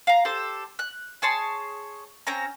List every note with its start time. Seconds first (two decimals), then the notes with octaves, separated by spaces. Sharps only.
0.07 F5 A#5
0.25 G4 A4 C5
0.79 F#6
1.22 G#4 C#5 A5 C6
2.27 C4 C#4 A#5